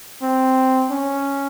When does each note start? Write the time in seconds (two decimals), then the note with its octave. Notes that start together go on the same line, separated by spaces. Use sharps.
0.22 C4
0.91 C#4